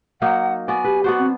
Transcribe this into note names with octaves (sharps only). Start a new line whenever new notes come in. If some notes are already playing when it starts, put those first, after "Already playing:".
F#3 A#3 D#4 F#5
B3 F#4 D5 G#5
G4 B4
B3 D4 F#4 C5
C4